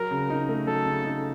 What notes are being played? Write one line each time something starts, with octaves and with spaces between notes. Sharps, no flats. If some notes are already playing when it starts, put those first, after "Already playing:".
Already playing: F#3 A#4
C#3
D#4
A3
F#3 A4
C#3
D#4